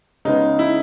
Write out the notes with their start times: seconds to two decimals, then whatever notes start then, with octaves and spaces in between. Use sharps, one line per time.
0.25 C#3 G#3 B3 D#4
0.59 E4